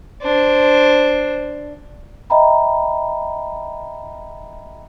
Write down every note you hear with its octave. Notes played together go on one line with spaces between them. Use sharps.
D4 C5
D#5 E5 G5 A#5 B5